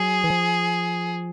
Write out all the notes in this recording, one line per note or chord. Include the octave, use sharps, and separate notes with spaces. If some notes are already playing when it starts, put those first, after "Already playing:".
Already playing: F#3 G#4
E3
F3